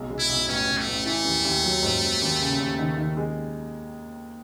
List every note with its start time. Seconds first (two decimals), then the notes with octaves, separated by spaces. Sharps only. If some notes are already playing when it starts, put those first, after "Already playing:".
Already playing: B1 G#3
0.10 G#3
0.19 E4
0.29 B1
0.48 A1 C#4
0.68 A1
0.78 A3
0.87 A1
1.06 E3 A3
1.25 D#2
1.45 D#2
1.64 F#3
1.83 G#2
2.02 G#2
2.22 D#2
2.40 C#3
2.60 D#2
2.79 D#3
2.98 D#3
3.17 G#3